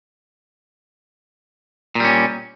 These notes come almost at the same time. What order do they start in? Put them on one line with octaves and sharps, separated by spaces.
A#2 G3 C#4